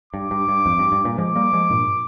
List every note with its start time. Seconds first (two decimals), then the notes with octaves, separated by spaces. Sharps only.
0.13 G2 D6
0.31 G2
0.49 G2
0.66 F2
0.79 G2
0.92 G2
1.04 G2 A#2
1.18 F3 G#3 D6
1.36 G3 A#3
1.53 F3 G#3
1.70 G2 A#2